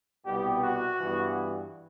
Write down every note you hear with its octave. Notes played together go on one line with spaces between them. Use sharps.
C2 B2 G3 B3 G4
F#4
G2 E3 B3